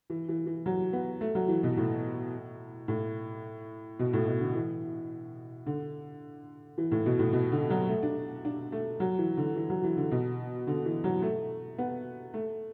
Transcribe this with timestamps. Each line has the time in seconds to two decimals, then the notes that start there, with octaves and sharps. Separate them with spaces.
0.10 E3
0.29 E3
0.46 E3
0.66 F#3
0.93 B3
1.21 A3
1.35 F#3
1.48 E3
1.63 B2
1.77 A2
2.88 A2
3.99 B2
4.13 A2
4.27 B2
4.41 D3
4.55 E3
5.66 D3
6.78 E3
6.91 A2
7.06 B2
7.19 A2
7.33 B2
7.52 D3
7.70 F#3
7.89 A3
8.03 D4
8.45 D4
8.72 A3
9.00 F#3
9.18 E3
9.37 D3
9.56 E3
9.70 F#3
9.83 E3
9.97 D3
10.11 B2
10.67 D3
10.85 E3
11.04 F#3
11.22 A3
11.78 B3
12.34 A3